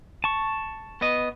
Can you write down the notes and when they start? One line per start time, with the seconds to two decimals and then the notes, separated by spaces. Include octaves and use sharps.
0.24 A5 C#6
1.01 B3 D#5